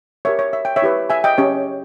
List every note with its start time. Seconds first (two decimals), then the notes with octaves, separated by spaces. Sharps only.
0.25 G4 A#4 C#5 E5
0.39 C#5
0.53 E5
0.65 G5
0.76 C#5 E5
0.82 E4 G4 B4
1.10 E5 G#5
1.24 D#5 G5
1.38 C#4 G4 C#5